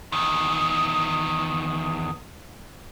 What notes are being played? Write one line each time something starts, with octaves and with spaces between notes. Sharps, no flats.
E2 D#3